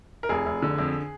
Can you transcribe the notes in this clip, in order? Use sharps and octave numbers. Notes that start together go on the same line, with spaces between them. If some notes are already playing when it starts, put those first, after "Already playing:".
A#4
F1 G#4
F1
D3
F2